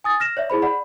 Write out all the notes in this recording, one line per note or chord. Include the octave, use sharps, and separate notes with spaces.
G#5 D#6 A6
F6 A#6 E7
C#5 D5 E5
E4 G#4 C5 B5
D5 F#5 B5